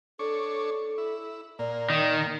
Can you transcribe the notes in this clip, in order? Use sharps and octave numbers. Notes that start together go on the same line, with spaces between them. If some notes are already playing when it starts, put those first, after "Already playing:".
D4 A4 C#5
E4
A#2 A#3 D5
D#3